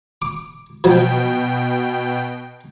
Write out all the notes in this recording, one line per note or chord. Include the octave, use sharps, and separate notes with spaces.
D6
B2 F3 F#3 G5